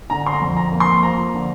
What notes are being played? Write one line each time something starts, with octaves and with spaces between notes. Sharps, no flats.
D3 A#5
C6
A#5
F2
A#5
A#3
C6
F3 A#5
D3